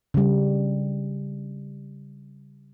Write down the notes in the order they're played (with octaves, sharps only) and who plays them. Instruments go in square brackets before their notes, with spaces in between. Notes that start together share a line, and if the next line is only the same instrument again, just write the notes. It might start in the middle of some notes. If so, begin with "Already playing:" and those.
[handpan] C#3 G3